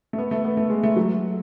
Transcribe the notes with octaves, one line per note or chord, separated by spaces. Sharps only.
A3
B3
A3
B3
A3
G#3
A3
F#3